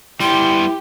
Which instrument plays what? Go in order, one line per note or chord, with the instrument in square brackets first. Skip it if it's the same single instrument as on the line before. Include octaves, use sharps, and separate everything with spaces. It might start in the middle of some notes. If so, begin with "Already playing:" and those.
[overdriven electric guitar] G3 B3 [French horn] E4 [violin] G4 [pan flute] C6